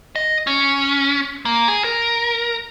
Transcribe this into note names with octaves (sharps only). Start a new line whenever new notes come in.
D#5
C#4
A#3
G#4
A#4